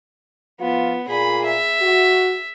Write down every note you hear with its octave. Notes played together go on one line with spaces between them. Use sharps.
F3 B3 F4
A#2 G#4 B5
E5
F#4